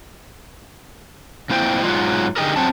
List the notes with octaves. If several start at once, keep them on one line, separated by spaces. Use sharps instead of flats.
F2 A#3 E4 C5 G5
G#2 F#3 G#3 F4
D3 D#4 G4 G#4 A#4
F#3 C4 A5